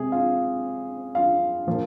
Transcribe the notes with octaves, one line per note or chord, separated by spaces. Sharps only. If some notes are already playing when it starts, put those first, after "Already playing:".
Already playing: C3 G#3 G#4
F4 F5
F4 F5
A#2 F3 A#3